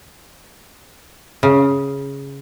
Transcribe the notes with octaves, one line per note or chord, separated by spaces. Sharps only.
C#3